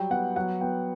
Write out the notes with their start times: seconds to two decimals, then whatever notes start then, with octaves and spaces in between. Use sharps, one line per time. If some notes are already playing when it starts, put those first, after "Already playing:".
Already playing: F#3 G3 G5
0.10 B3 F#5
0.36 F#3 F#5
0.61 B3 G5